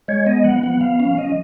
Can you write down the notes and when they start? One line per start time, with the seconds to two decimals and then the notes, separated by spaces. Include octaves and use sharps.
0.08 G#3 C#5
0.26 B3 D#5
0.44 F3 F#5
0.63 B3 F#5
0.81 F3 F5
1.00 C#4 F5
1.17 F3 D#5